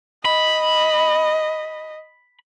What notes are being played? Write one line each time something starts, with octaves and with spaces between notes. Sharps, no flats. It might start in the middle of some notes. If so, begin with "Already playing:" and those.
D#5 B5